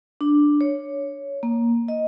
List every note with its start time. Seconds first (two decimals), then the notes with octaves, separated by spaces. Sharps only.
0.21 D4
0.61 C#5
1.43 A#3
1.88 D#5